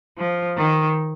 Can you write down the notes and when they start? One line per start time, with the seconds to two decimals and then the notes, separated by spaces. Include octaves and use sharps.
0.17 F3
0.57 D#3